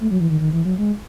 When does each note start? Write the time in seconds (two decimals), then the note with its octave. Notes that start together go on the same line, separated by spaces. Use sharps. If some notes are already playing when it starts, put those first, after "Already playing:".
0.01 A3
0.11 F#3
0.20 E3
0.30 D#3
0.40 D#3
0.53 E3
0.65 F#3
0.78 G#3